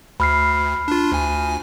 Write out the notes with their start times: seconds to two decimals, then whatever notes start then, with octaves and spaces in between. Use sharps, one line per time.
0.20 D2 B5 F6 C7
0.88 D4 F4
1.12 D2 G#5